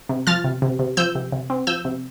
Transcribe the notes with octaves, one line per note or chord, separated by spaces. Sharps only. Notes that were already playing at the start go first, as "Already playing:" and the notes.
C3
F3 F6 A6
C3
C3
C3
F3 E6 G6
C3
C3
C4
F3 E6 G6
C3